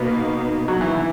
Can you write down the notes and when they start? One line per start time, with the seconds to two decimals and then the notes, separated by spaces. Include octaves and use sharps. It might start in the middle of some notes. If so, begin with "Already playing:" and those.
Already playing: B2 A#3 B3 D#4
0.68 F#3
0.81 E3
0.94 E3